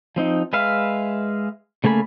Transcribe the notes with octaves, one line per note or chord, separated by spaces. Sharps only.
F3 C4 D#4
G#3 B4 E5 F5
C#3 A3 A#3 G#5 B5